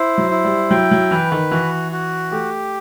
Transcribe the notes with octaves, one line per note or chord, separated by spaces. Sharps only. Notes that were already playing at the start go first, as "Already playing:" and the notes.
Already playing: E4 C5
F#3
E4
G3
F#3 G5
F#3
E3 B4
D#3
E3 F#4
F#4
A3 G4